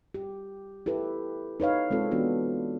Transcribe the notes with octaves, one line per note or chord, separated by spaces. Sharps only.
G4
E4 G4 A4 B4
D#4 B4 C#5 F5
G#3 C4 F4 A4
E3 B3 D4 F#4